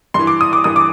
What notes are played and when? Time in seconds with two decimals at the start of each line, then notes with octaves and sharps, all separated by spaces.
0.14 G2 E3 C6
0.27 D6
0.41 D#6
0.53 D6
0.64 G2 E3 D#6
0.76 D6